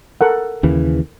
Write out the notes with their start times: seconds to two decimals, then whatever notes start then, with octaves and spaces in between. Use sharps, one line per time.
0.21 A4 A#4 F#5
0.63 D#2 C#3 E3